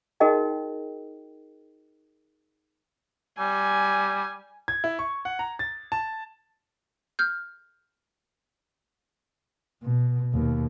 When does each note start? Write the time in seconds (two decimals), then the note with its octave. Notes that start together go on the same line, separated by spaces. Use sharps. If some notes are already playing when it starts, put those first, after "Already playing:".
0.20 D#4 F#4 G#4 A#4 D#5 G5
3.39 G3 G#5
4.68 G#6
4.84 E4
4.99 C#6
5.25 F#5
5.39 A#5
5.59 A6
5.92 A5
7.19 F6 G6
9.83 B2
10.34 D#2 B2